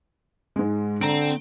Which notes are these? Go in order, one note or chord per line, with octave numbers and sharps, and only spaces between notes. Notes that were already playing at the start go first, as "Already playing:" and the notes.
G#2 G#3
D3 C4 A#5 D7